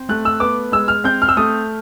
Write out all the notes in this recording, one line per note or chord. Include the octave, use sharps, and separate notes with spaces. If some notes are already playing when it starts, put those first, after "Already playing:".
Already playing: C4
A3 F#6
E6
B3 D6
G#3 E6
F6
C4 G6
F6
E6
A3 D#6